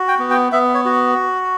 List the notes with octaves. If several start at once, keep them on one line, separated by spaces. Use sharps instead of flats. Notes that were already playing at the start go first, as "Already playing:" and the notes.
Already playing: F#4
G5
B3
G5
B3 E5
C#5
F#4